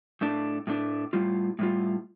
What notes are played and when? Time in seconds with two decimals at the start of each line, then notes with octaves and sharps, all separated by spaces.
0.21 A2 A3 D4
0.67 A2 A3 D4
1.13 A2 G3 F4
1.59 A2 G3 F4